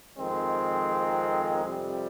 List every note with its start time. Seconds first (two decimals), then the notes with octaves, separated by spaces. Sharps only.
0.17 F2 D#3 G#3 C4
1.64 F2 C3 G3